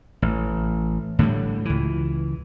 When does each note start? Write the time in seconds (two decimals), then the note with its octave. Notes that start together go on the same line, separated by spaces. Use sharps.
0.22 A1
1.19 A2 D3 F#3 G3
1.65 C#2 E3